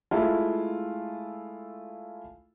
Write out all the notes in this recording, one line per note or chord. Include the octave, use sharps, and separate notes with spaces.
G#3 A3 E4 F4